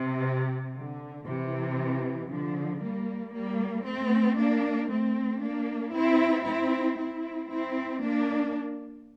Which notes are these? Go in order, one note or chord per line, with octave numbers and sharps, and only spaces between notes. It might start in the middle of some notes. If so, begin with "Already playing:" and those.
Already playing: C3
D3
C3 E3
D3 F3
G3 A#3
G3 A#3
A3 C4
A#3 D4
A3 C4
A#3 D4
C4 E4
C4 E4
C4 E4
C4 E4
A#3 D4